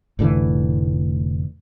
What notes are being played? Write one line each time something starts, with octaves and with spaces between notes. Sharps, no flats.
F1 A2 D3 E3